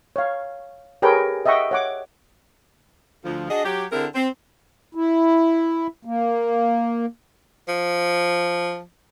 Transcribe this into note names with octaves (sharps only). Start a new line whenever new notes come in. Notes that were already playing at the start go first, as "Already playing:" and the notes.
C#5 F5
G4 G#4 A#4 B4 C#5 G5
D#5 E5 F#5 G5 C#6
C#5 F#5 D6
D2 F3
D4 F#4 G#4 D#5
F#3 G4
D3 C4 E4 G#4 A#4
C4
E4
A#3
F3